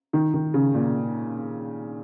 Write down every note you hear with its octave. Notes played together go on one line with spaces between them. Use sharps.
D#3
D#3
C#3
A#2